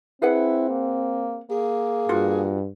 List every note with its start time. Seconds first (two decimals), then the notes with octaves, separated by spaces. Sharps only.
0.22 C4 E4 G#4 B4 F#5
0.70 A#3
1.51 A#3 G#4
2.09 G2 F4 F#4